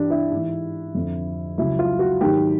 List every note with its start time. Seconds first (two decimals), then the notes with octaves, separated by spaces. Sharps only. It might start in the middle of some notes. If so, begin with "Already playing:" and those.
Already playing: G2 E3 D4 G4
0.10 E4
0.31 G#2
0.37 E3
0.95 F2 D3 F3
1.58 C#2 C#3 F#3 E4
1.79 F4
1.99 F#4
2.21 G#2 D#3 F#3 G4